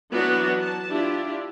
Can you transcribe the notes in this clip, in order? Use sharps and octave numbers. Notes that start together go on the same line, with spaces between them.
E3 F#3 B3 D4 F#4 D5
A5
D4 E4 F4 G4